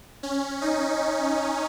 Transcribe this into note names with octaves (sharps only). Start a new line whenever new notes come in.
C#4
D#4